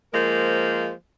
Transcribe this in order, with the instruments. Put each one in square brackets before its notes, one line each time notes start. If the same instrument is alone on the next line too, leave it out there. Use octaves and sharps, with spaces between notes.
[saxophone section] F3 G#3 A#3 A#4 C5